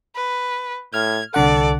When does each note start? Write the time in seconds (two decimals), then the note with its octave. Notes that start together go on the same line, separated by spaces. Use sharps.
0.16 B4
0.94 A2 F6 G#6
1.34 C2 D3 A4 D5 F#5